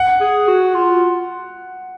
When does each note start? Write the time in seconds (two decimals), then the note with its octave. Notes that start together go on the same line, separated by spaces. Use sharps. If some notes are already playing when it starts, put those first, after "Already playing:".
Already playing: F#5
0.20 G#4
0.48 F#4
0.74 F4